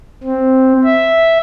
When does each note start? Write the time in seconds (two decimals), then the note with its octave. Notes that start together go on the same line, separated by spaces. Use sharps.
0.23 C4
0.84 E5